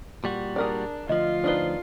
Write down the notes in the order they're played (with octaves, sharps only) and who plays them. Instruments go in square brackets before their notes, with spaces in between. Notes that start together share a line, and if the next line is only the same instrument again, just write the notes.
[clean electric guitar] A#2 G3 F#4
[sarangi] D4 [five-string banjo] G#4 A#4 D5
[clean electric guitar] D2 F3 [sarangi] F4 [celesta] D#5
[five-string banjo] D4 D#4 B4 [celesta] C5 C7 G7